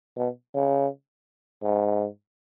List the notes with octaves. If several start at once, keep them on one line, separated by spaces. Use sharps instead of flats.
B2
C#3
G#2